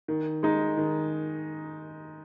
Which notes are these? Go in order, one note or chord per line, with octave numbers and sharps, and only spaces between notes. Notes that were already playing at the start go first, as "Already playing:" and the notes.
D#3
G#3 D#4
D#3